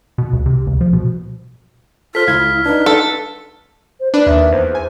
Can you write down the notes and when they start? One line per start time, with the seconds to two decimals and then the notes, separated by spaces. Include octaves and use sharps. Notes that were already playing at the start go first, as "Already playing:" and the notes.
0.18 B2
0.33 C#2
0.46 C3
0.67 C#2
0.81 F3
0.93 B2
2.15 F4 A4 C5 F6 B6
2.28 C#2 E4 F5 G#6
2.66 D4 D#4 B4
2.86 A4
4.00 C5
4.14 D4 B4 D5
4.26 D#2 E5
4.52 E2 C5
4.75 G#5